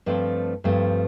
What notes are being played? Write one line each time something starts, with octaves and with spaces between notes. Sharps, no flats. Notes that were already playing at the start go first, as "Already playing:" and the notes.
G2 F3 A3 C4
G2 F3 A3 C4